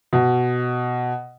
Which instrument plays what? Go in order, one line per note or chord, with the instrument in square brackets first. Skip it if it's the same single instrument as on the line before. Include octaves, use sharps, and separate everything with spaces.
[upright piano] B2